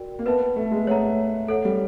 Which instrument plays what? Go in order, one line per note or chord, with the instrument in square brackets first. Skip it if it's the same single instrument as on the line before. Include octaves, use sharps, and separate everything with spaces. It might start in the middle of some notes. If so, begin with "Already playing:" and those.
Already playing: [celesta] F#4 A#4 D5 G5
[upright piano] A#3
[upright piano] B3 [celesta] B4 E5 A5
[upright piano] A3
G#3
[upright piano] A3 [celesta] C#5 F#5 A#5
[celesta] A4 C#5 F#5
[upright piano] G3